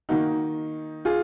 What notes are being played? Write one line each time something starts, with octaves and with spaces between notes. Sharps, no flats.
D#3 A#3 D#4 F#4
F4 G#4